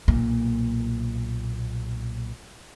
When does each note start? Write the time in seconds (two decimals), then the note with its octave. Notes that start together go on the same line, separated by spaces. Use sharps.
0.08 B1 A#2 A#3